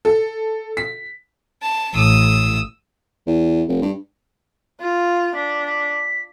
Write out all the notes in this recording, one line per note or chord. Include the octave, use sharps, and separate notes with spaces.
A4
B6
A5
A1 D#6 E6
E2
F1
G2
F4
D4 B6
B6